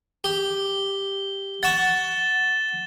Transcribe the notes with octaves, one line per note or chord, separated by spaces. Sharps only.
G4 G7
F#5 C#6 A6 E7 G7